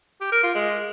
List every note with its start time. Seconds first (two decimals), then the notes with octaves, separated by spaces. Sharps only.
0.21 G4
0.32 A#4
0.43 F4
0.55 G#3